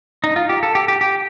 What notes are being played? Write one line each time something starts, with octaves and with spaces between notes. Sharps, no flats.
D#4
F4
G4
A4
G4
G4
G4